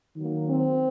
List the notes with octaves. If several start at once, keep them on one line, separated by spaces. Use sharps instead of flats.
D#3 F#3 A#3
C4